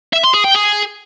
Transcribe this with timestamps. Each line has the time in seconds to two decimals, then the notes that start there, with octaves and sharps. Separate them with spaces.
0.13 E5
0.24 C6
0.34 G#4
0.45 G5
0.55 G#4